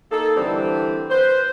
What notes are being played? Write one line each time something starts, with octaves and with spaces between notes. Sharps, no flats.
A#3 D#4 A4
D3 E3 G3 C4 D4
B4 C5